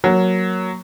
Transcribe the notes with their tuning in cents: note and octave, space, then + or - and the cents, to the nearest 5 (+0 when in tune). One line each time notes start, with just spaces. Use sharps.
F#3 +0 A#3 +0